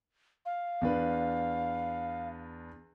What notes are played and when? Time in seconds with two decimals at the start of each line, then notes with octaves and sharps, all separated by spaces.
0.46 F5
0.81 E2 D4 B4